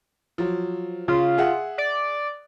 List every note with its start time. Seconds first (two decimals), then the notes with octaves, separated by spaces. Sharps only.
0.38 F3 F#3
1.08 C#3 F4
1.38 G#4 E5 F#5
1.78 D5